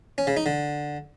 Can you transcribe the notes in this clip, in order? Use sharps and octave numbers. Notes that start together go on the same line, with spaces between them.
C#4
C#3
D#4
D3